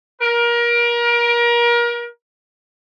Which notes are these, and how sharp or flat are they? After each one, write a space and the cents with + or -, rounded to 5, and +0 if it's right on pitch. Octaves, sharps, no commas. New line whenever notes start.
A#4 +30